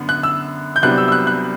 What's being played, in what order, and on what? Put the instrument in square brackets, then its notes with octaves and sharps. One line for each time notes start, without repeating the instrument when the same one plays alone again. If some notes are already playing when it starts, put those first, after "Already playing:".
Already playing: [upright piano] F#2 D3 B3
F#6
E6
G6
C2 C3 F#3 B3 D4 F#6
E6
E6
F#6
F#6